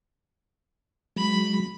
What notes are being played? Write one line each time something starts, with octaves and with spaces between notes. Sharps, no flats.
F#3 G#3 B5